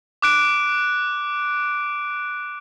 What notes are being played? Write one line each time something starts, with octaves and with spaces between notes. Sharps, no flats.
D6 F#6 D7